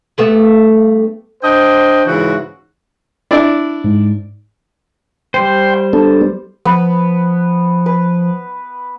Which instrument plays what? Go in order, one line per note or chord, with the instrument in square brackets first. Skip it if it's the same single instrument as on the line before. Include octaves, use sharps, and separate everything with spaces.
[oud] G2 A3 B3
[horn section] D4 C5 D#5 G5
G#2 C#3 E3 F#4
[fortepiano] D4 E4 D5
[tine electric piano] G#2
[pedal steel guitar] G3 C5 [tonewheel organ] G5 C6
[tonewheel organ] B3 D4 A4
[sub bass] F3 [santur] B3 B4
[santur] B4